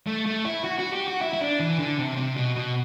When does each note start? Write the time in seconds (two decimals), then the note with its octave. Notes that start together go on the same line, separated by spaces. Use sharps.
0.07 A3
0.26 A3
0.45 E4
0.64 F#4
0.79 F#4
0.93 G4
1.08 F#4
1.21 E4
1.33 E4
1.41 D4
1.60 E3
1.79 D3
1.98 C3
2.17 C3
2.36 B2
2.55 B2